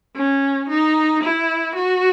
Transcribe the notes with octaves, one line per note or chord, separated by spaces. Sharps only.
C#4
D#4
E4
F#4